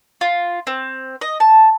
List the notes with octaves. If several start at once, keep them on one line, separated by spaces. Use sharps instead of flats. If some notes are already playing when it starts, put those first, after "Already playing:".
F4
C4
D#5
A5